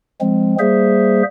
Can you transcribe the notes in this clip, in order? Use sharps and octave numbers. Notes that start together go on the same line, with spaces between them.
F3 G#3 C4
G3 A#3 G#4 C5 E5